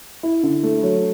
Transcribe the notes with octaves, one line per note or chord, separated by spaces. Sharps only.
E4
D3
A3
F#3